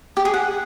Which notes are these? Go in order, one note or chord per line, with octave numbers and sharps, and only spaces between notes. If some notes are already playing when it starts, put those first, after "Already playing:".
G4
G#4
F#5